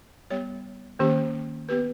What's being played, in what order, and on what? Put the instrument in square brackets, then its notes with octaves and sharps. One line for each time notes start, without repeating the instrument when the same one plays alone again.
[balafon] G3 B3 G4 C#5
D#3 A#3 C#4 G4
B3 G4 B4